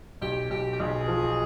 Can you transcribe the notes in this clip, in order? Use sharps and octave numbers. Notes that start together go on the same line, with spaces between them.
B1 G4
B1 G4
G4
B1 G#4
F3